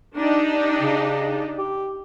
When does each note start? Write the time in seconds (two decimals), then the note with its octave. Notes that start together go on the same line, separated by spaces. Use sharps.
0.16 D4 D#4 G4
0.81 C#3
1.58 G4